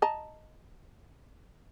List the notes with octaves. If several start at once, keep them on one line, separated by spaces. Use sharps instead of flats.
D#5 A5 A#5